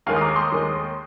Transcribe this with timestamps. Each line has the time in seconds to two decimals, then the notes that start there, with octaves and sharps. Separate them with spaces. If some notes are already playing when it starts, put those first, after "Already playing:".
0.06 D#2 D#3 G#3 F5 G#5
0.16 D#6
0.21 A#5 D6
0.36 C6 D#6
0.51 D#2 D#3 G#3